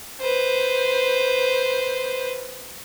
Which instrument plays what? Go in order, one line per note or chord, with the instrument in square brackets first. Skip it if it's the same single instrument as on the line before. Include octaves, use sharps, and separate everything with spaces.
[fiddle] B4 C5